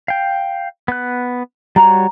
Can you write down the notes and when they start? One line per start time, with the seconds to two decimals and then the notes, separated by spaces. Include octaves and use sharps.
0.08 F5 G5
0.88 B3 F#6
1.76 G3 F#4 C#5 A#5